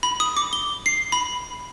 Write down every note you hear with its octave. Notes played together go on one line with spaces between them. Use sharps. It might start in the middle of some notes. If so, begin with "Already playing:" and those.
B5
D#6
D6
G7
C7
B5